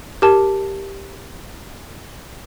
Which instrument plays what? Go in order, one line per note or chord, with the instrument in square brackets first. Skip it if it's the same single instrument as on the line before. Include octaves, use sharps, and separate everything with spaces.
[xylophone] G4 A#4 A5